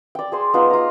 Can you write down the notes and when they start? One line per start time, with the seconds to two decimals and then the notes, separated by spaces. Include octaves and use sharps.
0.15 D5 G5
0.32 G#4 C5 C6
0.54 B3 D#4 F4 C5
0.70 F4 A#5